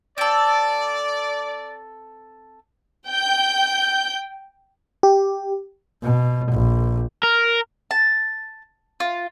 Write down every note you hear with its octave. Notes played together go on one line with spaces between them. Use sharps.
C4 A4 D5
G5 G6
G4
B2
A#1
A#4
A5
F4